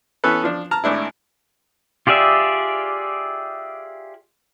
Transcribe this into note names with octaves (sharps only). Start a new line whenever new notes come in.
E3 B3 C#4 A4 B4
F3 D4
A5 A#5 F6
G#1 A2 D4 E4
F4 G4 G#4 D5 E5